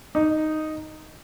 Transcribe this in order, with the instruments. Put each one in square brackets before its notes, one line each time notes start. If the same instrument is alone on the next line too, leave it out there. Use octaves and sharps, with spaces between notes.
[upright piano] D#4